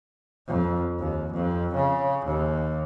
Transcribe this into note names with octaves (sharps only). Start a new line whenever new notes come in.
F2
D#2
F2
C#3
D#2